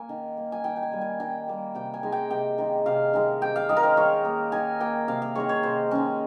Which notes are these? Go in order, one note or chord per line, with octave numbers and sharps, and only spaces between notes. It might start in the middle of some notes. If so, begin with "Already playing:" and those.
Already playing: A#3 G#5
D#3
A#3
G#5
D#3 G5
G5
G#5
G3 A#3
G#5
D#3 G5
G3 A#3
C3 G5
G#5
D#3 G#3
G5
C3 G5
D#3 G#3
C3 F5
D#3 G#3
C3 G5
F5
D#3 G#3 D#5
A#4
C5
D#3 C#5
A#3
D#3 G#5
A#3 G5
C3 F5
F5
D#3 G#3 C#5
C#5
C3 C5
D#3 G#3 C#4